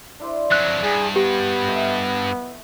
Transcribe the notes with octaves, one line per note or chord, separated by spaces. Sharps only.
D4 E4 C5
F2 F#3 F#6
G2 G#4
B3 G4
A3 D#5 E5